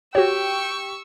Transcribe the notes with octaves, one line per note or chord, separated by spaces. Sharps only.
F#4 G4 C#5 G5 C#6 E6